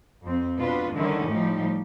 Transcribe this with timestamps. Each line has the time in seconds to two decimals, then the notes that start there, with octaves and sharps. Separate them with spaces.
0.23 F2 C4
0.58 B2 D4 F4 B4
0.94 D3 D#3 G3 C#4 E4 A#4
1.28 A2 F3 G3 D#4 G4